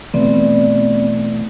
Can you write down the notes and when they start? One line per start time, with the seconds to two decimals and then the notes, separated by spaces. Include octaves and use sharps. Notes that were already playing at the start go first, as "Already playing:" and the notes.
0.14 B2 E3 A3 B3 C4 D5